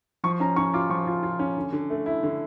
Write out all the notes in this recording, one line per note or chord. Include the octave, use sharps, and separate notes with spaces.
F3 C#6
C#4 A#5
C#4 C#6
F4 D6
F3 C#6
F4
F4
C#4
D3
D3
A3
E4
D3